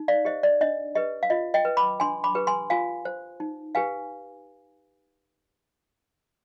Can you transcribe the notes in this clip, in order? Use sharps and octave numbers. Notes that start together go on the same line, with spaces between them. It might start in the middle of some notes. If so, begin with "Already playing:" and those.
Already playing: D#4
D5 F5
G4 C5 D#5
D5
D4 D#5
G4 B4 D#5
F5
F4 D#5
D#5 G5
B4
B5 D6
D4 G#5 C6
B5 D6
G4 B4
G#5 C6
F4 F5 G#5
C5
D#4
G4 B4 F5 G#5